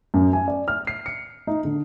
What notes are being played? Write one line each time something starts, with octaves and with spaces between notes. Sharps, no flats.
F#2
G#5
D5
F6
C7
C#7
D#4
D3